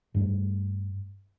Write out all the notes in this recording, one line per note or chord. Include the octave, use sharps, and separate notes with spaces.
G2 G3 A3